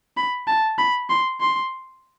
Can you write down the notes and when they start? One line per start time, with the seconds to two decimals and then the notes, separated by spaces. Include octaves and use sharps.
0.17 B5
0.48 A5
0.78 B5
1.10 C6
1.41 C6